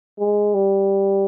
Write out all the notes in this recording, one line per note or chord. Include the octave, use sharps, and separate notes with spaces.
G#3
G3